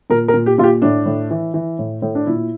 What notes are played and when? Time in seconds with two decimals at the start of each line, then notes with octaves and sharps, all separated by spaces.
0.10 A#2 A#4
0.28 A#4
0.34 A#2
0.46 G4
0.58 A#2 F4
0.63 G4
0.82 A2 D4
1.06 A2
1.31 E3
1.54 E3
1.79 A2
2.02 A2
2.15 D4
2.27 A#2 E4